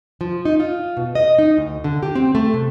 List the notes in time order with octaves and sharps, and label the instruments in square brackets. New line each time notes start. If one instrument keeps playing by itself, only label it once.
[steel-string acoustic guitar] F3
D#4
F4
B2
D#5
D#4
D2
D3
G4
C4
A3
C3